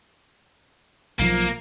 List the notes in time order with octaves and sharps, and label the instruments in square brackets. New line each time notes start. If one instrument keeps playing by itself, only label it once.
[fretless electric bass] B1 E3 F3 [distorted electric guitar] A#3